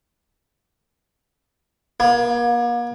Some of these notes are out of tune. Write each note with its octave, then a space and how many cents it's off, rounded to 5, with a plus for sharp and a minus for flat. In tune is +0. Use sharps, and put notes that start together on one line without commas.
A#3 +40